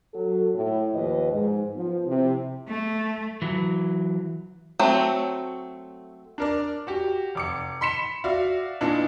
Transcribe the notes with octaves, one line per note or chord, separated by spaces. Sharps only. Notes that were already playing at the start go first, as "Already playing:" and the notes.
F#3 A4
A2
D#2 F3 B4 D#5
G#2
F3 B3
C3 E4
A3
E3 F#3
F#3 A3 C4
D4 A#4 D5
F#4 G4
F1 D6 C#7
B5 C6 B6 C#7 E7
F#4 D5 E5 F5
A#2 E3 B3 D4 D#4